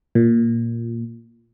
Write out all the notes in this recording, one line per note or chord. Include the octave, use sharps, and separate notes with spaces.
A#2